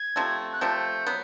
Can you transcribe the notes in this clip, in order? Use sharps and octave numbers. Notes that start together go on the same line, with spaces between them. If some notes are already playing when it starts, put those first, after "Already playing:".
Already playing: G#6
C3 F3 A3
F#6
C3 F3 A3 G6
F#3 B3